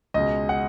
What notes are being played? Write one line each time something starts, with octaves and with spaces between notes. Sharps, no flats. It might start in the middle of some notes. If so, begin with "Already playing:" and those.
C#2 B2 G#3 D#5
F#5